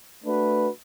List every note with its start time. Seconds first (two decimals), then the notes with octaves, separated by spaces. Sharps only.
0.24 A3 D4 F#4 B4